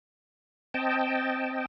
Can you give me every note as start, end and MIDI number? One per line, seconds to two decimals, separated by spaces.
0.74 1.66 60
0.74 1.66 75
0.74 1.66 79
0.74 1.66 81